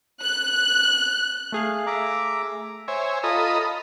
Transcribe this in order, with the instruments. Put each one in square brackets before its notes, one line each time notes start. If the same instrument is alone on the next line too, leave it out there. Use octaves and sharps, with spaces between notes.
[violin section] F#6
[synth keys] A3 G#4 F5
[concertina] E5 A#5 D6
[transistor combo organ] C5 C#5 E5 G#5
F4 A4 D#5 A#5 B5 D#6